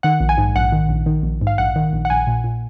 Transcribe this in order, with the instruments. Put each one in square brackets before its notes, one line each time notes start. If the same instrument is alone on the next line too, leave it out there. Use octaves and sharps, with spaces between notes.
[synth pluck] D#3 F#5
A#1
G#5
G#2
A#1 F#5
D#3
A#1
D#3
A#1
G#2
F5
A#1 F#5
D#3
A#1
F#5
A#1 G#5
A#2
A#2